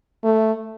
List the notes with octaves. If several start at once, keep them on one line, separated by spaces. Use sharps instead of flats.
A3